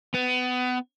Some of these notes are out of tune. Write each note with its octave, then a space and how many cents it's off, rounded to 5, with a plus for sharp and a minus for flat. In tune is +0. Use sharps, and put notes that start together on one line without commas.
B3 +25